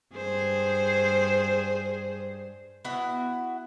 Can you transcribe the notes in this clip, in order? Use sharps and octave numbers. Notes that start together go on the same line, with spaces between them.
G2 G#4 C5
B3 E4 F#4 F#5